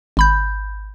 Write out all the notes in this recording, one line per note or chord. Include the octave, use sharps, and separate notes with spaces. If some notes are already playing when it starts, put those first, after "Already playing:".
G#1 B5 G6